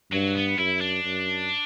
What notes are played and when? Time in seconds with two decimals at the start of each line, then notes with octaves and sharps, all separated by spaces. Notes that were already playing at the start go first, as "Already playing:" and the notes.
0.12 G2 F#3
0.35 B3
0.58 F#2 E4
0.81 D4
1.04 F#2